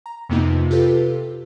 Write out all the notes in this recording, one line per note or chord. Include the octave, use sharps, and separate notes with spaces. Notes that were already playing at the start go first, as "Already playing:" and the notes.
A#5
F2 C3 A#3 B3 D#4 F4
C3 F4 G4 A4 B4